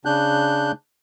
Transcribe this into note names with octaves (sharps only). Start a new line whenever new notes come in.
C#3 D4 F#6 G6